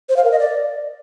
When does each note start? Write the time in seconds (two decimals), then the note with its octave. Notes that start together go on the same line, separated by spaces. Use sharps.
0.09 C5
0.17 F5
0.24 A#4
0.32 D#5
0.39 D5